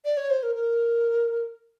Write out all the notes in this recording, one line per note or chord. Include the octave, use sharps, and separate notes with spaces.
D5
C#5
C5
A#4
A#4